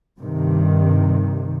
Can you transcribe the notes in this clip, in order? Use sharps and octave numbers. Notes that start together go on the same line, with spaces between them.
G2 C3 D#3